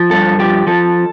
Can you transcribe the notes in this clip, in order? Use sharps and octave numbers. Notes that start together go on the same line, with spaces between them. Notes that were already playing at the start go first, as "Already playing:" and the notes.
Already playing: F3
G2 A4
F3 G4
F3 A4